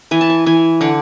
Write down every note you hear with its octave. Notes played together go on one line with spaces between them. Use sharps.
E3 G#5
A5
G#5
E3 G#5
D3 F#5